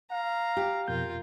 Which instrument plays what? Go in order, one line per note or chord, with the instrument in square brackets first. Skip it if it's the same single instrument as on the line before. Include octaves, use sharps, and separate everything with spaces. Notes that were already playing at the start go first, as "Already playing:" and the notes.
[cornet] F5 [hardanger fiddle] A#5
[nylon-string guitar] G4
[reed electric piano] F2 B2 G6 [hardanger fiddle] F4 A#4